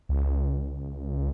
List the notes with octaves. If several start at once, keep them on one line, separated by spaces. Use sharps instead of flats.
C#2